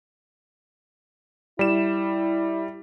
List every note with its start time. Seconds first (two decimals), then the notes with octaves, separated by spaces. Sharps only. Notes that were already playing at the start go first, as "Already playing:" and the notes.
1.59 G3 E4 E7